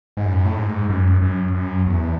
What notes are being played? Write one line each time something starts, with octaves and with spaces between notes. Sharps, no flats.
G#2
F#2
A2
G#2
F#2
F#2
F#2
E2